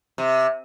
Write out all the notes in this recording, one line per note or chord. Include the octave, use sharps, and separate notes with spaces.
C3